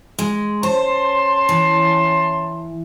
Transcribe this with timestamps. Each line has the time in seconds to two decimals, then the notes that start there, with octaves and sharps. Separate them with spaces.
0.19 G#3
0.63 C#4 C5 A5 C6
1.49 E3